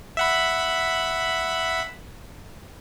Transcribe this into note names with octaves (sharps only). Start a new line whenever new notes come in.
E5 F#5 B5